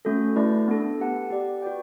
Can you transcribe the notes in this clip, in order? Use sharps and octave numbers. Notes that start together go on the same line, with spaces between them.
A3 C#4 F#4 A4
A3 E4 B4 D5 A5
B3 D4 A4
G4 B4 F#5 A5
G4 D5 F#5
F#4 B4 D5 G5